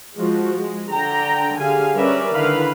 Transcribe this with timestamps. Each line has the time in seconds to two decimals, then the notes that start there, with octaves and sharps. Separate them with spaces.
0.17 F3 G#3 F#4
0.55 G#3
0.91 D3 G5 A#5
1.58 D3 G4 G#4 F5 G#5
1.95 G3 C#4 A#4 B4 D5 E5
2.35 D3 D#3 E4 B4 F5 B5